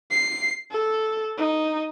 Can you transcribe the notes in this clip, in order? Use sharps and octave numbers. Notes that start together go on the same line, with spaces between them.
C7
A4
D#4